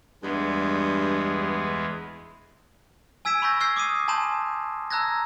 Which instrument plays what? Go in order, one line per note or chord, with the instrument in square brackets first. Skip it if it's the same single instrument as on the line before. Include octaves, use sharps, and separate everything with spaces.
[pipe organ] E2 G#3 B3 [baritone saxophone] G2
[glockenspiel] G#5 E6 G#6 B6 D7 E7
B5 C#6 E6 G6 A#6
C#6 E6 F6 G6 G#6 C7
D6 D#6 C7 D#7
G#5 A5 B5 C6 G6 E7
A5 A#5 E6 F#6 G#6 A#6